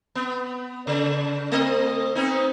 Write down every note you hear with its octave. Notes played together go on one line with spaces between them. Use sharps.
B3
C#3
A3 C4 D#5
B3 C4 D#4